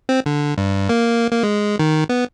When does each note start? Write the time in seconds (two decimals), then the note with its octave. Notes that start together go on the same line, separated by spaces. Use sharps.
0.09 C4
0.26 D3
0.58 G2
0.89 A#3
1.31 A#3
1.43 G#3
1.79 D#3
2.09 B3